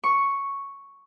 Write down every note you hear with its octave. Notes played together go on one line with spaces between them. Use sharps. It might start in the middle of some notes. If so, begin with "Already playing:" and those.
C#6